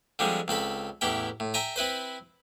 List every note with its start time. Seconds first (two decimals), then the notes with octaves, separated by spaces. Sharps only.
0.19 D3 F3 G3 G#3 C4
0.48 C#2 C4 A4 B5
1.01 A1 E2 E4 G4 G5
1.40 A2
1.54 E5 G5 G#5 A#5
1.76 C4 E4 B4 C5